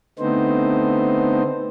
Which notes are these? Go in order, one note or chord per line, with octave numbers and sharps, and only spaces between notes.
D3 A3 B3 C4 D#4 C5